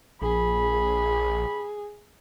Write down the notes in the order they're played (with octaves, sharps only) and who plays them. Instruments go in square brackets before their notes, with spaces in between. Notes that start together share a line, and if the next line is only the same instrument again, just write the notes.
[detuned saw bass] A#1 [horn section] G2 B5 [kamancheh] G#4